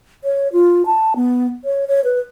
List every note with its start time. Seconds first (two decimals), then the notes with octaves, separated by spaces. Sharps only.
0.24 C#5
0.53 F4
0.86 A5
1.16 B3
1.65 C#5
1.87 C#5
2.04 B4